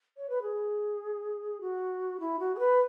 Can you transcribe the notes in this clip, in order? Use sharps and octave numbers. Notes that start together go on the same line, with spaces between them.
C#5
B4
G#4
F#4
E4
F#4
G#4
B4